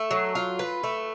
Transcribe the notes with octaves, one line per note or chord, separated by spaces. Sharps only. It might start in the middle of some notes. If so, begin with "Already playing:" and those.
Already playing: A3
F#3
F4
B4
A3